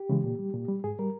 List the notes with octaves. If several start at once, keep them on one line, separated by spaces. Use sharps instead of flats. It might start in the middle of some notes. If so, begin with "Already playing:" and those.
Already playing: G4
C#3 E3 G#3
A#2
G3
A#2
G3
G#2 G#4
G3 A#4